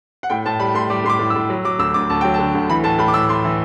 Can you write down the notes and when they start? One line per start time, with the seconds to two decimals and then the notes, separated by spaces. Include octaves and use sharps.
0.23 F#5
0.30 A2 G5
0.46 A2 A5
0.59 G3 B5
0.74 A2 C6
0.90 G3 D6
1.04 A2 C6
1.10 D6
1.19 A2
1.30 E6
1.35 A2
1.50 F#3
1.65 F#3 D6
1.79 D2 E6
1.94 D2 D6
2.10 D2 A5
2.21 F#3 G5
2.34 D3 A5
2.55 D2
2.70 E3 B5
2.84 A2 A5
2.99 A2 B5
3.08 D6
3.14 A2 E6
3.29 A2 C6
3.44 E3